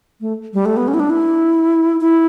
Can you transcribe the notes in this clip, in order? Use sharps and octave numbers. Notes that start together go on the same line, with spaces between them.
A3
G3
A3
B3
C#4
E4
D4
E4
E4